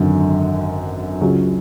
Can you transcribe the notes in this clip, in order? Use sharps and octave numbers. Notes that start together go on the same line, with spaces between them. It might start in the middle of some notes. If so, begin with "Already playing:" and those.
Already playing: G#1 F#2 D3
C#2 C#3 F#3 C#4